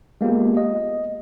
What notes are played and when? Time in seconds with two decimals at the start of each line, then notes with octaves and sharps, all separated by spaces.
0.21 G#3 A#3 B3 F4 G4
0.57 D#5